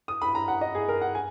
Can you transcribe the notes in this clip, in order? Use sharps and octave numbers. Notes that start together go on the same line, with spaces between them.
D#6
B5
A#5
F#5
D#5
G#4
A#4
F#5
G#5